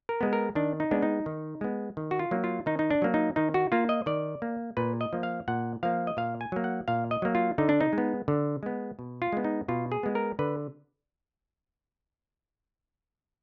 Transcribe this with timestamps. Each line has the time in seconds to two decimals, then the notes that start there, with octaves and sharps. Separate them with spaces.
0.09 A#4
0.21 G#3 B3
0.33 A#4
0.55 D#3 D4
0.80 D#4
0.91 G#3 B3 D4
1.02 D#4
1.26 D#3
1.61 G#3 B3
1.97 D#3
2.11 F#4
2.19 F4
2.31 F#3 A#3
2.44 F4
2.66 D#3 D#4
2.79 D#4
2.91 D4
3.02 F#3 A#3
3.14 D#4
3.36 D#3 D#4
3.54 F#4
3.72 A#3 F4
3.89 D#5
4.06 D#3 D5
4.42 A#3
4.77 A#2 B4
5.01 D#5
5.13 F3 A#3
5.23 F5
5.48 A#2 F#5
5.83 F3 A#3 F5
6.07 D#5
6.17 A#2 F5
6.41 G#5
6.52 F#3 A#3
6.64 F#5
6.88 A#2 F5
7.11 D#5
7.22 F#3 A#3
7.35 F4
7.58 D3 D#4
7.69 D4
7.81 D#4
7.93 G#3
7.98 B3
8.28 D3
8.63 G#3 B3
8.99 B2
9.22 F4
9.33 G#3 B3
9.44 D#4
9.68 B2 F4
9.92 G#4
10.03 G#3 B3
10.15 A#4
10.39 D3 B4